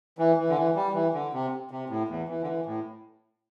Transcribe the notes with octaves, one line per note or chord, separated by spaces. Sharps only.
E3
E3
D3
E3
G3
E3
D3
C3
C3
A2
E2
E3
D3
E3
A2